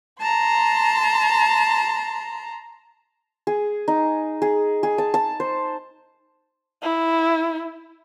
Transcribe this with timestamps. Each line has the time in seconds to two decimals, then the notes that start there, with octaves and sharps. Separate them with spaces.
0.21 A5 A#5 C6
3.47 G#4
3.88 D#4
4.42 G#4
4.83 G#4
4.98 A5
5.14 A5
5.40 C5
6.82 E4